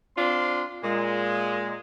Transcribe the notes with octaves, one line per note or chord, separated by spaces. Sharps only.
C4 D4 F4 C6
A#2 G#3